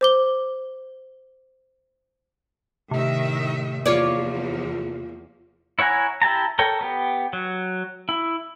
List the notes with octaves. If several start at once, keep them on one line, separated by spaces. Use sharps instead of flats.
C5 D6 G7
A2 C3 D#3 E5
E2 F3 A#3 F4 C#5 D5
E4 C#5 F#5 G#5 A#5
E4 G4 A5 A#5
A4 A#4 C#5 G5
B3 G4
F#3
E4